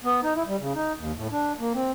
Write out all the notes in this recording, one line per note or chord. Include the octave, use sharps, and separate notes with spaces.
B3
D#4
E4
G3
C#3
D#4
D#2
A2
D4
A#3
C4